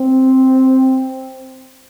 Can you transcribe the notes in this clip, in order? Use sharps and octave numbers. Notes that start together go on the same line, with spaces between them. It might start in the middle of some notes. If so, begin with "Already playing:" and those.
Already playing: C4